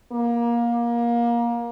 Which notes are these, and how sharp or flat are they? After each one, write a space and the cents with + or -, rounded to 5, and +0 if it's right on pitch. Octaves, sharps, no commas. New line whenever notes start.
A#3 +20